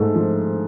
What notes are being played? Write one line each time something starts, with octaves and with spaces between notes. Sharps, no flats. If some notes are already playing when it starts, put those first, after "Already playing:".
Already playing: G#2 A3
F3